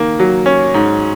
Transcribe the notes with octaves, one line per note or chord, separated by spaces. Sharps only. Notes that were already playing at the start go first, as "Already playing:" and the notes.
Already playing: D#3 A#3
F#3
C#4
G#2